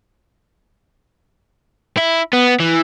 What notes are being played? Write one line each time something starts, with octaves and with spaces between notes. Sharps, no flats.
E4
B3
E3